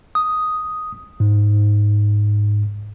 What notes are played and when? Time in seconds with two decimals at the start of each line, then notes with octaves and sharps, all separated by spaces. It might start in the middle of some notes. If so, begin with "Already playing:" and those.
0.15 D#6
1.20 G#2